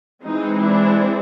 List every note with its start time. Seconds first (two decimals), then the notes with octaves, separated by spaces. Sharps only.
0.24 E3 G#3 C4 D#4
0.62 D4 E4